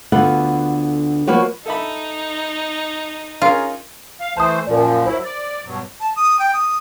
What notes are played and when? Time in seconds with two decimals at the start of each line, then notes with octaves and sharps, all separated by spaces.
0.12 D2 D3 B3 F4 A4 F#5
1.27 F3 A#3 B3 F#4 B4 C#5
1.66 D#4 A4 E5 B5
3.42 C#4 F4 G#4 A#4
4.20 F5
4.37 E3 A3 C5 A5 D#6
4.67 F#2 A#2 F3 A#4 D5
5.06 F#3 E4 C5
5.24 D5
5.65 G2 B2 F#3
6.00 A5
6.16 D#6
6.39 G5
6.53 D#6